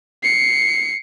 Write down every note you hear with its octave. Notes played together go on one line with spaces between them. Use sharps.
C7 C#7